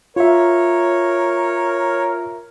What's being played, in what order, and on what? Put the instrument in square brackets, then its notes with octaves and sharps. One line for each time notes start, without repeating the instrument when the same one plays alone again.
[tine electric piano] F4 E5 [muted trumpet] A#4 [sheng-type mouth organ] C#5